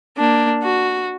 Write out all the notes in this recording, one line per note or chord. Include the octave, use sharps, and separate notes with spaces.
A#3 D4
F#4